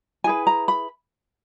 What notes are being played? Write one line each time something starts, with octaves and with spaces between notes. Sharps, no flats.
E4 G#4 B4 G#5
A#5
B5